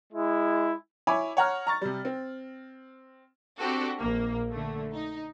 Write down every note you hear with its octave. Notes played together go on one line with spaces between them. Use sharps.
G#3 E4
E4 C#5 G#5 B5 D6
C#5 F#5 A#5 F6
A#5 C#6 A6
C3 G3
C4
C4 D4 F#4 G4 A4
A#1 A#3
D3 A3
D#4